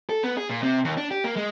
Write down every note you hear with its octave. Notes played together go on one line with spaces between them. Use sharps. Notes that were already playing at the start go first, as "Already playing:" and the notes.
A4
B3
G#4
A#2
C3
D#2
D4
G4
A#3
G#3